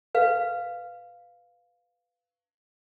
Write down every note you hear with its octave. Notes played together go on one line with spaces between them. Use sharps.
B4 F5